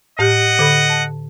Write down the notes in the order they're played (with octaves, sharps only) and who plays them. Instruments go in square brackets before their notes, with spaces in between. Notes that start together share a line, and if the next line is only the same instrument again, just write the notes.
[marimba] A2 G4 G6 [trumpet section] D#5 F#5
[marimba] D3 A4 B5
A5